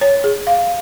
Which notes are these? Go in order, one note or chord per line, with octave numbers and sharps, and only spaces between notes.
C#5
G#4
F5